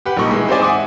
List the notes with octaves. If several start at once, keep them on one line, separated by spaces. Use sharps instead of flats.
G4 B4 F#5 G5
A#1 G3 A#3 D#4 C#6
E3 G#3
C4 D#4 G4 C5 D5 G#5
E5 F#5 G#5 D6 D#6